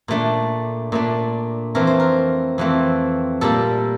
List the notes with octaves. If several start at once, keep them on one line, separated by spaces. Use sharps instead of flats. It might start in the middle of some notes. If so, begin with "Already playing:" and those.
A#2 A3 D4
A#2 A3 D4
F2 E3 A3 C4 A#4
C5
A#4
F2 E3 A3 C4
A#2 G3 A#3 A4